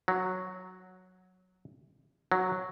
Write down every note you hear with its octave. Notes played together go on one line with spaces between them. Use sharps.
F#3
F#3